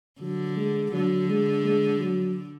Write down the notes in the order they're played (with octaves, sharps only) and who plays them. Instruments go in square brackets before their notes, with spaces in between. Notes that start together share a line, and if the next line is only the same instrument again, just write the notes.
[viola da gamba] D3 [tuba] F#3
[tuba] G#3
[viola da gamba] D3 [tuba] F#3
[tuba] G#3
G#3
F#3